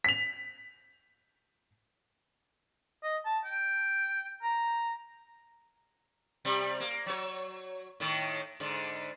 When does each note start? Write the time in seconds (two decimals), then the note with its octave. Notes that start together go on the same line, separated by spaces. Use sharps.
0.05 B6 F7
3.04 D#5
3.26 A5
3.45 G5
4.43 A#5
6.45 C3 G3
6.80 A#3
7.06 F#3 C#5
8.00 A2 D#3
8.60 G#2 D3